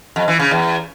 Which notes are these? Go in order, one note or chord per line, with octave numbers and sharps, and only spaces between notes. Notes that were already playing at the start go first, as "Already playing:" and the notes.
F2
E3
C#3
E2